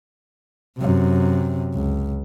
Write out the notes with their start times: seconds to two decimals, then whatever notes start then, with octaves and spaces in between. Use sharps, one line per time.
0.78 F#2 C3
1.74 C#2